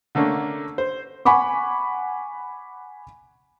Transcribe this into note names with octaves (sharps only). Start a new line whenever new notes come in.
D3 A3 A#3 C#4 D4
C5
F#5 G#5 B5 C#6 D6